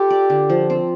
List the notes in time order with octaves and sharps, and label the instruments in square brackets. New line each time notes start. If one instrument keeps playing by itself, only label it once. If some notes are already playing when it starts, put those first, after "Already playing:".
Already playing: [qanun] F4 A4 C5 [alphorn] G4
[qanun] D5
D3
F3
C4